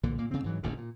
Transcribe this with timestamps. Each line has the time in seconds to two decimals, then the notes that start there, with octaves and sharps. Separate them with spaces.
0.03 B1 A#2 D3 E3
0.18 A#2 A#3
0.31 C#3 C4
0.44 G#2 E3 F#3
0.63 D1 A1 A2 D#3
0.77 A#2